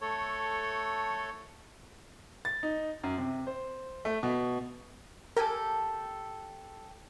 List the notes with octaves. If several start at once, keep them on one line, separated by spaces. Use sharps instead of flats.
A3 A4 C#5
A6
D#4
F#2
C3
C5
A3
B2
G4 A4 A#4 G#5